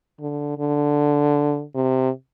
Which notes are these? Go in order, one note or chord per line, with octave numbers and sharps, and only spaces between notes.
D3
D3
C3